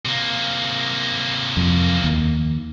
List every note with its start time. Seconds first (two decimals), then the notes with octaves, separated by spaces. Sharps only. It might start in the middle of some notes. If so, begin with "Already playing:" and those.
0.05 C3 A#3
1.57 F2
2.04 D#2